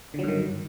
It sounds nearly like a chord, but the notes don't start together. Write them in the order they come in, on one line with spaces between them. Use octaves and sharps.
D3 F#3 G2 D#3